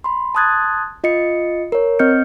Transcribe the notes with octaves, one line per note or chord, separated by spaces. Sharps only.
B5 C6
A5 C6 D#6 F#6 G#6 A6
F4 D#5 C7 C#7
A#4 C#5
C4 D#5 F6 G6 C#7